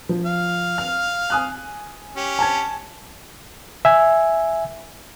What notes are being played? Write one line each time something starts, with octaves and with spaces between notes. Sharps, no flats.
F3
F5
F6
G#5 D#6 F#6
C#4 G4
G#5 A5 G#6
E5 G#5